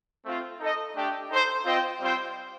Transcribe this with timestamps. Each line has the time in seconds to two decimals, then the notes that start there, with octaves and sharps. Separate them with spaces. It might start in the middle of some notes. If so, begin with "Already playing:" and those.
0.25 A3 C4 F4
0.60 D#4 A4 D#5
0.95 A3 D4 G4
1.30 D#4 A4 C5
1.65 C4 F4 C5 D#5 G5
2.01 G3 C4 F4 C5 G5